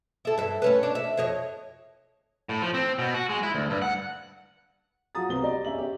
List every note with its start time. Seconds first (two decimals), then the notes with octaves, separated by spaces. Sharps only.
0.25 E4 A4
0.38 G2 E5
0.62 A3 C#4 B4
0.83 D4
0.95 E5
1.17 F2 C#5 D#5
2.49 A2
2.62 F3
2.74 C4
2.99 B2
3.14 F#4
3.29 G#3
3.43 E4
3.54 D2
3.70 G2
3.82 F#5
5.15 F#3 F4 F#4 A#5 D#6 A6
5.29 C2 B3 C4 G7
5.43 G4 D5 D#5 A#5
5.65 E2 C#4 G4 E5 F#7
5.78 G4